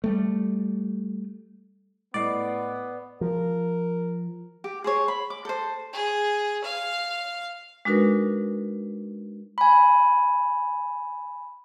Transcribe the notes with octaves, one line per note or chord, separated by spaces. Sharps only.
G3 A3
A2 B3 D5 D#5 C7
F3 A#4
G4
G#4 C5 C#5
B5
D6
A4 C5
G#4
F5
G#3 D4 D#4 F#4 A#4 B4
G#5 B5